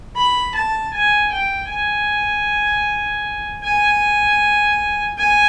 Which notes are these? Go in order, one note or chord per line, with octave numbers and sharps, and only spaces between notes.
B5
A5
G#5
G5
G#5
G#5
G#5